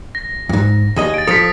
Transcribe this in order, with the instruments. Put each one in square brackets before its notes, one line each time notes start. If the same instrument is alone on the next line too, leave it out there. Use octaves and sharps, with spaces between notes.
[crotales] A#6
[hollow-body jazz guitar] F2 G#2
D#2 G#4 D#5
[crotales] A6 D7
[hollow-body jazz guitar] F3 A4 [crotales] D#6 B6